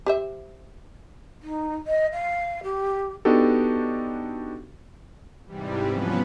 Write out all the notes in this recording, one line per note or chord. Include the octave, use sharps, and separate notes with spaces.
G4 C5 E5
D#4
D#5
F5
G4
B3 D4 D#4 F#4 G4 A4
G#2 C3 E3 G3
F3 F#3 B3 C#4 B4